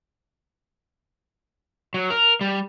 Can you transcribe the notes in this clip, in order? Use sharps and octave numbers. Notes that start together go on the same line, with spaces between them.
F#3
A#4
G3